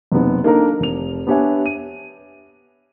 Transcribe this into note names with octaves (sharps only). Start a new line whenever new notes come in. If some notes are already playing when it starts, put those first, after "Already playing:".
F#1 C3 B3 D#4
A#3 D4 D#4 A4 A#4 A#5
F1 F7
B3 D4 G4 C#5 E5 G#5
D#7